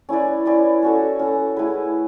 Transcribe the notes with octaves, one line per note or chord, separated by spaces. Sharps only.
C#4 E4 B4 D5
C#4 E4 B4 D5
C#4 F#4 A4
C#4 F#4 A4
A3 E4 G#4 B4